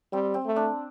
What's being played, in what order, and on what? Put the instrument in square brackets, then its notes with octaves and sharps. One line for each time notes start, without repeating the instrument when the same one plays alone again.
[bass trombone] G3 [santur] C4
[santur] C4
[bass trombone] A3
[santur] D4